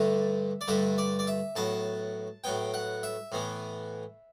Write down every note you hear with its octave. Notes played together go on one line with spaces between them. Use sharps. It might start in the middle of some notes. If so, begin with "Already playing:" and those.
Already playing: G2 D3 A3 E5
D5
G2 D3 A3 E5
D5
D5
E5
A2 F#3 B3 A5
A2 F#3 B3 G5
F#5
E5
A2 E3 B3